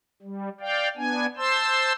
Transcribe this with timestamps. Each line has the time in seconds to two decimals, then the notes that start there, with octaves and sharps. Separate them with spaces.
0.22 G3
0.60 D5 F5 G5
0.97 B3 D4 G#5
1.37 C5 A5 C6 E6